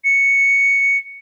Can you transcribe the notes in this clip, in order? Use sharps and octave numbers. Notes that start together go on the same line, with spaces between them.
C#7